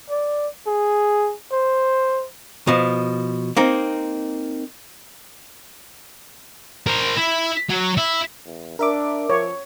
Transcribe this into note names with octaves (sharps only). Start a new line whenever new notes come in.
D5
G#4
C5
B2 F3
A#3 C4 D#4
A#4 C5
E4 E5
F#3
E4
E2
D4 A#4 E5 D6
F3 C#5